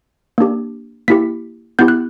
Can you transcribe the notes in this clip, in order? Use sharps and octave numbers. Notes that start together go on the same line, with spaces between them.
A#3 D4 G4
A#3 E4 G4 B6
B3 E4 G4 G6
F#6